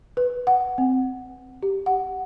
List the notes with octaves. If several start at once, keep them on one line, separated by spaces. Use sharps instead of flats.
B4
F#5
C4
G4
F#5